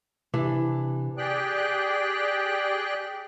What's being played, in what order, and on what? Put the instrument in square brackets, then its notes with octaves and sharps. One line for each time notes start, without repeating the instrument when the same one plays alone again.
[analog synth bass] C3 [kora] E3 D4
[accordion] G4 G#4 D5 G5 F#6